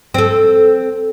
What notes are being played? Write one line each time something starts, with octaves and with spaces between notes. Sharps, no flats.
C4 A4